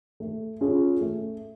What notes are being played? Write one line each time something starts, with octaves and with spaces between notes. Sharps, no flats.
A3
C#4 F4 G#4
A3